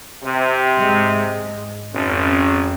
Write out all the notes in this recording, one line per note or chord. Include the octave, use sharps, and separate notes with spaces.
C3
G#2 G#3
G#1 F2 C#4